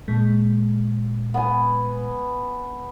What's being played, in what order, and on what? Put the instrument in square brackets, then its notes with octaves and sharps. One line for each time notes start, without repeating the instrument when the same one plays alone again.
[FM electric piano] A#2 G#3
[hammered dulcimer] B3 G#5